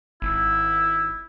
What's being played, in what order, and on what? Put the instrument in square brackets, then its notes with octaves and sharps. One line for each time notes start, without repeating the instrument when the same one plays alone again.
[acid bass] G#1 [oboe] E4